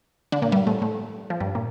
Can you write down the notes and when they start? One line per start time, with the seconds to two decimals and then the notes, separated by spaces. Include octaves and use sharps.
0.32 D3 D4
0.42 A#2 A#3
0.52 G2 G3
0.67 A2 A3
0.82 A2 A3
1.30 F3
1.40 G2 G3
1.55 A#2 A#3